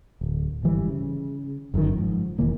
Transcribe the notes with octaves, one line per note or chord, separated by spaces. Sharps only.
D1
G1 G#2 E3 G3
C#3
G1 F#2 C3 D#3
G#2 F3
E1 D#3 E3 A#3